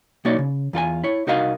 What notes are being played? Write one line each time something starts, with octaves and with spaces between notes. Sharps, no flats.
B1 A#3 D#4 F#4 C#5 D5
C#3
E2 F4 A4 G#5
E4 C#5
C2 D#4 F#4 A#4 D#5 F5